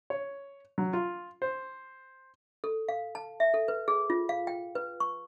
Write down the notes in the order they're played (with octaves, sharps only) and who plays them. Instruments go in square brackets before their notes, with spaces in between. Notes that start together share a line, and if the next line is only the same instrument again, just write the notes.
[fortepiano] C#5
F#3
F4
C5
[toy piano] A4
F5
A5
E5
A4
B4
G#4
F4
F5
G5
B4
C#6